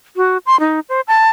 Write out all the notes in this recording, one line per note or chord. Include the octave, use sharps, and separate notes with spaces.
F#4
C6
D#4
C5
A5